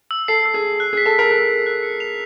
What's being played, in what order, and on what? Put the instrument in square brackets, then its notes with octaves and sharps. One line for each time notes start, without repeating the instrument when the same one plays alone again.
[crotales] E6
[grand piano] A4 [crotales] C7
[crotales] E6
[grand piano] G#4
[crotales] C7
F#6
[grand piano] G#4
[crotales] B6
[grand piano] A4
[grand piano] A#4 [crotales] B6
[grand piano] A4 [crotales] F#6
[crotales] F#6
F#6
C#7
F7